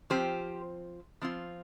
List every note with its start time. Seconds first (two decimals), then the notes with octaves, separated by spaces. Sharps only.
0.10 F3 C4 F4 G4 C5
1.22 F3 C4 F4